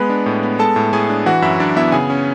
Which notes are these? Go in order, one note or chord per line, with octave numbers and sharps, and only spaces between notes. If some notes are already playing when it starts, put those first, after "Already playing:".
Already playing: G#3 B3 B4 B5
D4
A2
B3
G#3 A4 A5
A2
A2 G#4 G#5
D4
E3 F#4 F#5
F#2 E4 E5
F#2 D4 D5
B3 E4 E5
C#3 G#4 G#5
C#4